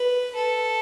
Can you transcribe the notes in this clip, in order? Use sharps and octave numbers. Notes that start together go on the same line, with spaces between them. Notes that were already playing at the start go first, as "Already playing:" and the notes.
Already playing: B4
A4